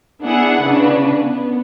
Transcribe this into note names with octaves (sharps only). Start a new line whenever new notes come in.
B3 D4 E4 G#4 F#5
C#3 D4 B4
B3